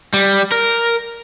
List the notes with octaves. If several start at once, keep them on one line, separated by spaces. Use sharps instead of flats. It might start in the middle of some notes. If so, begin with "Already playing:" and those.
G3
A#4